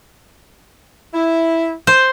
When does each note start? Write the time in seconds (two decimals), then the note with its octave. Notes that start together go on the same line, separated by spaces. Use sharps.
1.14 E4
1.87 C5